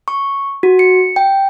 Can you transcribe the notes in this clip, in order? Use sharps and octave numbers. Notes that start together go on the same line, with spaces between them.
C#6
F#4
C#7
G5